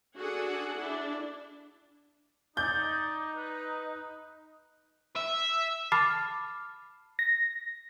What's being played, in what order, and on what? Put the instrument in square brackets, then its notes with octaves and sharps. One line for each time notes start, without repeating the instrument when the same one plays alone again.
[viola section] D4 F#4 G#4 A4 F#5
D4 E4
[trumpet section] D#4 [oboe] D5 [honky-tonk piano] G6
[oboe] B4
[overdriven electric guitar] E5
[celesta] A5 B5 D6 F6 A6 C7
[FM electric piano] A#6